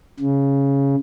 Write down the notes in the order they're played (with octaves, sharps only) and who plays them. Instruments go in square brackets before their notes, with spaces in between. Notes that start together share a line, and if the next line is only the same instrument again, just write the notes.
[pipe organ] C#3